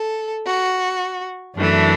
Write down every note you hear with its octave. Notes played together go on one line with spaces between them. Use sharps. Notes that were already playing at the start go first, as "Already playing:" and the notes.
Already playing: A4
F#4
F#2 E3 A3 D4